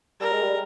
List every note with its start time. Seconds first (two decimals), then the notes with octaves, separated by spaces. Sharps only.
0.20 G3 A#4
0.32 G#3
0.43 G3